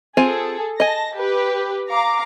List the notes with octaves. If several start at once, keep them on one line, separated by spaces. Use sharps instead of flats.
C4 F4 G#4 A4 G#5
D#5 G#5 A5 A#6
G4 B4
F5 A#5 D6